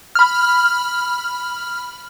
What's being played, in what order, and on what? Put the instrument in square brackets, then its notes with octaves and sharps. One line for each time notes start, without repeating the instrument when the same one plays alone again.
[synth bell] B5 F6